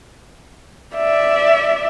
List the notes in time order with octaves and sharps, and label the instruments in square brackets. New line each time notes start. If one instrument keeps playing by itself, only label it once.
[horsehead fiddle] D5 E5